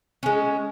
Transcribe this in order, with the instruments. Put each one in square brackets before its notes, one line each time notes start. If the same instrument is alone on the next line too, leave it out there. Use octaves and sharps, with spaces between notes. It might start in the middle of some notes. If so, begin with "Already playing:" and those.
[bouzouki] G#3 C#4